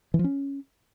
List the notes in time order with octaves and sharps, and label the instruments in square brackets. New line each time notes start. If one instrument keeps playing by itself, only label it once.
[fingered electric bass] E3
F3
C#4